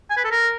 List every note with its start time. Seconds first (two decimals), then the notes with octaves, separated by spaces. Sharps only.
0.10 G#5
0.17 B4
0.24 A4
0.31 A#4